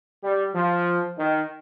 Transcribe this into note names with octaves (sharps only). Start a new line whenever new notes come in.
G3
F3
D#3